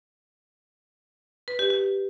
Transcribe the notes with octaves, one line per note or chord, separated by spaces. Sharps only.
B4
G4
G4